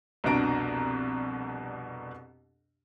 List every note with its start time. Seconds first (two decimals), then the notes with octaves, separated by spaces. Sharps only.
0.24 C2 F2 B2 D4 A#5 D7